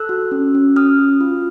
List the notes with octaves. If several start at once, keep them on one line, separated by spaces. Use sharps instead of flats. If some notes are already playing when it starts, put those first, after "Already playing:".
Already playing: A4 E6 F#6
F#4
C#4
C#4
C#4 D#6 F6
F#4
F4